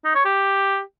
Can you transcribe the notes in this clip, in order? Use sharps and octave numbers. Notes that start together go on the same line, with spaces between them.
D#4
C#5
G4